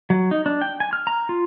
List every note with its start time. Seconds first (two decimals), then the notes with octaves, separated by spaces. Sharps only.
0.10 F#3
0.31 D#4
0.46 D4
0.61 G5
0.80 G#5
0.93 F6
1.07 A#5
1.29 F4